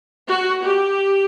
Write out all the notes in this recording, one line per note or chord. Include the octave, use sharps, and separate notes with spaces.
F#4
G4